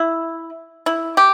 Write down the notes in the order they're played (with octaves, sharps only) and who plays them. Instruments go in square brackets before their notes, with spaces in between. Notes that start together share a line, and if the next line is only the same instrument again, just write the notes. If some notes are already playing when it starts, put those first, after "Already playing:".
Already playing: [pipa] E4
E4
G4